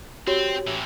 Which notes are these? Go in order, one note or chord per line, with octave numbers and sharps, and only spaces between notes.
C4 F#4 G4 C#5
A2 E3